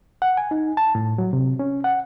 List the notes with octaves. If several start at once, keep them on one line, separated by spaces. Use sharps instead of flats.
F#5
G#5
D#4
A5
A2
F#3
C3
C#4
F#5